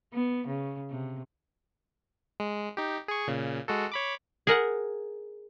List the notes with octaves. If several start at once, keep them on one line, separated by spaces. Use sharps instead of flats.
B3
C#3
C3
G#3
D#4 G4
G#4 C#6
A#2 C#3
G#3 F#4 A4
C#5 B5 D6
G#4 A#4 F#5